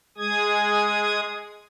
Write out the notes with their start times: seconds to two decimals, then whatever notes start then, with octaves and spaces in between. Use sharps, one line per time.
0.18 G#3 G#4 D#6 G#6